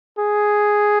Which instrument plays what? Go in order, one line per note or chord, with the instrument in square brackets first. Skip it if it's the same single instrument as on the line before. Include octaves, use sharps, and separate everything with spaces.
[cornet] G#4